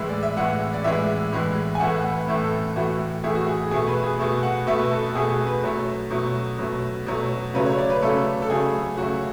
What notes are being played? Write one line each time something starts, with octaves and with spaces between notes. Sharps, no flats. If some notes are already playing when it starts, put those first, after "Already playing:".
Already playing: A2 E3 G#3 E5
D5
E5
A2 E3 G#3 F#5
D5
A2 E3 G#3 E5
A2 E3 G#3
G#5
A2 E3 A3 F#5
F#5
B4
A2 E3 A3 A4
A4
A2 E3 A3 F#4
A2 E3 A3 G#4
F#4
G#4
B2 A3 G#4
B4
G#4
B2 A3
F#5
B2 A3 E5
B4
A4
B2 A3 G#4
B4
B2 F#3 A3
B2 F#3 A3
B2 F#3 A3
B2 F#3 A3
C#3 F#3 A3 B4
C#5
D5
B4
C#3 F#3 A3 A4
A4
C#3 F#3 A3 G#4
C#3 F#3 A3 F#4